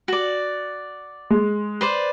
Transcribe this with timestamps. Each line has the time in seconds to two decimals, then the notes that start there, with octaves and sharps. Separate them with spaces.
0.08 F#4 D5
1.30 G#3
1.81 B4 C5 D5